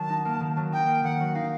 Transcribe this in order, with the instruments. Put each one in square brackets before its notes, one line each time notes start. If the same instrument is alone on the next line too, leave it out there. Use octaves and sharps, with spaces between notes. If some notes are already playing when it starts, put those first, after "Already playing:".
Already playing: [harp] D#3 F#3 [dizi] A5
[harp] D#4
A#3
D#3
F#3
[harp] D#4 [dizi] G5
[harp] A#3
[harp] D#3 [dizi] F#5
[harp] F#3
[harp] D#4 [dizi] F5